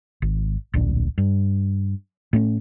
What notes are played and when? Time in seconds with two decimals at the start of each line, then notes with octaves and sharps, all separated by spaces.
0.22 G#1
0.74 D1 A#1 D4
1.18 G2
2.33 A2 A3 C#4